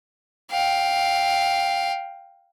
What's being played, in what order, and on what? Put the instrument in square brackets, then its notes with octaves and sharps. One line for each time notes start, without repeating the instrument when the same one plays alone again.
[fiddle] F5 G5